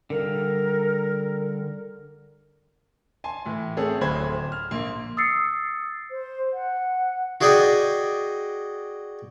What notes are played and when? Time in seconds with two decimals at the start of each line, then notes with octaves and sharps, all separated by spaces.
0.10 D3 G3 A#4 F5
3.24 G#5 A5 C6
3.46 A2 E3
3.77 A3 C4 C#4 G#4 A4
4.01 D1 D2 D3 C5 B5 G#6
4.52 F6
4.71 A#1 A#3 C6
5.17 D#6 E6 A6 C7 C#7
6.11 C5
6.53 F#5
7.41 F#4 G#4 D5 D#5 G5 G#5